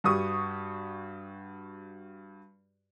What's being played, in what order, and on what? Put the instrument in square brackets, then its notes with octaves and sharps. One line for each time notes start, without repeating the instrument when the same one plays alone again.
[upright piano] G2 F#4 G4 C#6 D#6